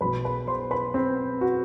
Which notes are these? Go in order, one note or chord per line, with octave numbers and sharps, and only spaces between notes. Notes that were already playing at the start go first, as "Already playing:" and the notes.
B1 B2 F#3 B3 B4 B5
B4 B5
C5 C6
B4 B5
C4 C5
F#4